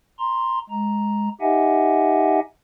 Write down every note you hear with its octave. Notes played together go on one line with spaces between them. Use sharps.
A#5 C6
G#3 A#5
D#4 G4 D#5 E5 F#5 G#5